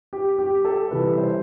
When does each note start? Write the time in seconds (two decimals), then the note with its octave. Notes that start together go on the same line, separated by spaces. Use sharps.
0.13 G4
0.39 G4
0.65 A4
0.91 C3 E3 G3 B4
1.17 C5